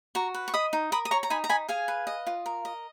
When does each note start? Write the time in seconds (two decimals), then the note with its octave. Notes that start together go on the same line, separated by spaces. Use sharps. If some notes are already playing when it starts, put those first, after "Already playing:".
0.15 F#4 A#5 C#6
0.34 B4
0.48 C#6
0.54 D#5 B5 D#6
0.73 D#4
0.92 A#4 B5 D#6
1.05 D#6
1.11 C#5 A#5 C#6
1.23 A#5
1.30 D#4 G#5 B5
1.44 A#5
1.49 D#4 G#5 B5
1.68 G#4 F5 G#5
1.88 B4
2.07 D#5
2.27 F4
2.46 A#4
2.65 D#5